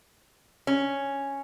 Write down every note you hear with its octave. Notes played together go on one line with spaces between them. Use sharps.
C#4